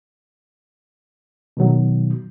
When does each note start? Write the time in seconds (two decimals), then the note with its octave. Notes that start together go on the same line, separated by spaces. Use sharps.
1.57 B2 D#3 F#3